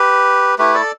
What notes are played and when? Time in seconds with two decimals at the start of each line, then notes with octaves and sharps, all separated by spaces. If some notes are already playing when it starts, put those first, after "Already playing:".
Already playing: G4 B4
0.59 A3 E4 G4 B4
0.74 A4 D5